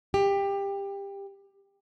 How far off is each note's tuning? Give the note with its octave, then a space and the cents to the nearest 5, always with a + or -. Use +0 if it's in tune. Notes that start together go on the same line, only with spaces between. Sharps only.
G4 +20